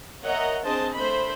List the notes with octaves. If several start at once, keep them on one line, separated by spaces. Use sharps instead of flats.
A#4 C#5 D#5 E5 F#5 A#5
C4 D4 G#4 C5 D#5 A5
A3 D4 C5 B5